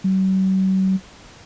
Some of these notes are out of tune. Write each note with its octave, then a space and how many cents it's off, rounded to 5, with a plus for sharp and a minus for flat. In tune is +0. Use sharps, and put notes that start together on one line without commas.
F#3 +45